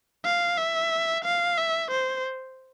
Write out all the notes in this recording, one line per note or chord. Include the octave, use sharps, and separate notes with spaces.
F5
E5
F5
E5
C5